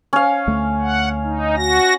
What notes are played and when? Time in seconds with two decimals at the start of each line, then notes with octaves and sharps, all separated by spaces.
0.13 C#4 F5
0.47 D2 A3
0.81 F#5
1.24 D#4
1.57 F#4 A#6